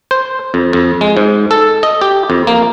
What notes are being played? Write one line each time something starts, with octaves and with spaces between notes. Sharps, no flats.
C5
F2
F2
G#3
G#2
A4
D#5
G4
F2
A#3